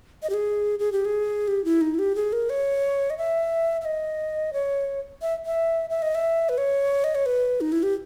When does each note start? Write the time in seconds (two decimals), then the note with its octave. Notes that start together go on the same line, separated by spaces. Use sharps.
0.23 D#5
0.30 G4
0.34 G#4
0.79 G#4
0.92 G4
1.05 G#4
1.48 G4
1.65 E4
1.81 D#4
1.95 E4
1.99 G4
2.16 G#4
2.33 A#4
2.50 C#5
3.10 D#5
3.18 E5
3.81 E5
3.85 D#5
4.53 C#5
5.22 E5
5.46 E5
5.90 E5
6.02 D#5
6.15 E5
6.49 B4
6.58 C#5
7.04 D#5
7.15 C#5
7.26 B4
7.61 D#4
7.72 E4
7.83 G4